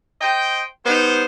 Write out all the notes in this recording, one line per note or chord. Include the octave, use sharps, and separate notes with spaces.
C5 D#5 G5
G3 B3 D#4 C5